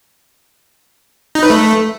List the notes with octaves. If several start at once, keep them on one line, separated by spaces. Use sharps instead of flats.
D#4
B4
A3